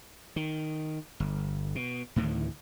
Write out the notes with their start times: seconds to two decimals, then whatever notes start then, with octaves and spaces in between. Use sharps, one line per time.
0.36 D#3
1.20 G1
1.75 B2
2.16 D2 A2 D#3 E3